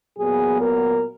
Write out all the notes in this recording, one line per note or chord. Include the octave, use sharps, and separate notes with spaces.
A#2 F#3 B3 G#4
A#4